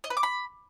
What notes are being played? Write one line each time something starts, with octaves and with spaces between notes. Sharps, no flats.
D#5
B4
D6
B5